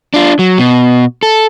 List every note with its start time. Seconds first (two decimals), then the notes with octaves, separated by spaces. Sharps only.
0.14 D4 F4
0.39 F#3
0.59 B2
1.23 A4